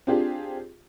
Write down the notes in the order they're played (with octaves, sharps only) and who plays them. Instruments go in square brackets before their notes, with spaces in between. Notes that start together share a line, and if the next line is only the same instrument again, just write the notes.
[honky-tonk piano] C4 D4 F4 G4 G#4